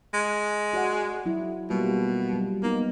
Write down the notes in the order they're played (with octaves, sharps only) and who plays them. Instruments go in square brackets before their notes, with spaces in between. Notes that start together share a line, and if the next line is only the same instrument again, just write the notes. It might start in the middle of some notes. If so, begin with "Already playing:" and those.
[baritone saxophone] G#3
[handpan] F#4 D5 F#5
F#3 E4
[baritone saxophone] B2 [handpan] G3 A#3 F4
[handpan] F#3 G3
[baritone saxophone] A#3 [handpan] B3 D#4